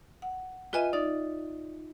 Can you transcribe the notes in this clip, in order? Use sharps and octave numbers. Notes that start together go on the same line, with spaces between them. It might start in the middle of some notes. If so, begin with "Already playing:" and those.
F#5
F4 B4 D#5 E5 G#5
D#4 D5